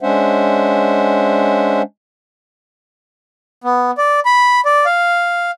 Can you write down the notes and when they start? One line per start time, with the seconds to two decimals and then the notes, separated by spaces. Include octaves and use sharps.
0.01 G#3 C#4 D4 C5 E5 F#5
3.64 B3
3.98 D5
4.25 B5
4.65 D5
4.86 F5